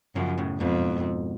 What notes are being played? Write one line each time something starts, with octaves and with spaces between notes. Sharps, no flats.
F#2 C#3 F3
A2 C#3
F2 G#2 B2